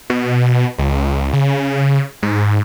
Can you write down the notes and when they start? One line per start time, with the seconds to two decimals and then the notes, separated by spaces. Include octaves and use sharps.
0.10 B2
0.78 C#2
1.33 C#3
2.23 G#2